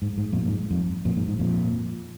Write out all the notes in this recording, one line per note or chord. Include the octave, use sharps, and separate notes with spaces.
G#2
G#2
F2 A#2
G#2
F2
F2 A#2
G#2
G#2
F2 A#2